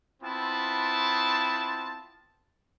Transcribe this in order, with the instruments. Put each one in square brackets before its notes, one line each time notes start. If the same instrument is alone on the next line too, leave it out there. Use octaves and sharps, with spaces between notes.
[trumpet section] B3 C4 E4 F4 A5